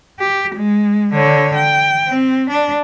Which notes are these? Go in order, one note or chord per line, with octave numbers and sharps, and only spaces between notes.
G4
G#3
D3 C#5
G5
C4
D4